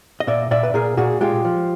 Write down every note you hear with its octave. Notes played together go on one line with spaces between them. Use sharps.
D#5
A#2 D5 E5
A#2 D5 E5
B4
A#2 G#4 A#4
A#2 F#4 G#4
G#3 F4 G4
F3